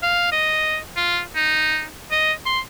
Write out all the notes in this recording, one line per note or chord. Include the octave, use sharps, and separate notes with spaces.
F5
D#5
F4
D#4
D#5
C6